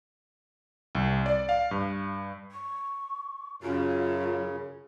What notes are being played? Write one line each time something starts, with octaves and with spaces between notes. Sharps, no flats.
C2
D5
F5
G2
C#6
F#2 C#3 F4